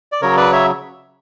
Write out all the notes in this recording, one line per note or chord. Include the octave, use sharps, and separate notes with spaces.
D5
C#3 F#3 A#4 C#5
B4 D5
C#5 E5